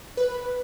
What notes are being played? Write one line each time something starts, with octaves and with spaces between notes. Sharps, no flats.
B4